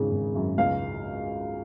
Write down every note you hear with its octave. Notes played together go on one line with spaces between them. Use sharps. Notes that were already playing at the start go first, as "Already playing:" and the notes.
Already playing: G#1 E2 C#3
G#1
F#2
C#2 F5